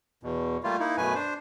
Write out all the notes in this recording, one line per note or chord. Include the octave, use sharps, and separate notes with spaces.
E2 B2
G3 A3 A#3 F4
A#3 D#4 E4
F#2 B2 A3 B4 G#5
D4 C5